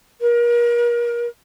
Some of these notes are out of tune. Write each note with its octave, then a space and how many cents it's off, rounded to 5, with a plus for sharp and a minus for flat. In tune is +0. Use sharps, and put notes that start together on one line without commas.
A#4 +35